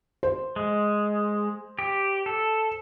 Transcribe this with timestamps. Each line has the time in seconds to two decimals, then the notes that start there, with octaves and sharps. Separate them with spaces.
0.23 C5
0.56 G#3
1.79 G4
2.26 A4